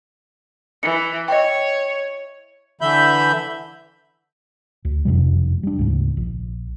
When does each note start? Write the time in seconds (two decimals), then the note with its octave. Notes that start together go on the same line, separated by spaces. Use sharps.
0.83 E3 C#7
1.28 C#5 D#5 G5
2.81 D3 E3 E5 B5 G6
4.85 D2
5.05 F#1 F2 C3 G3
5.63 G3 D4
5.79 D2 G#2 C#3
6.17 A#1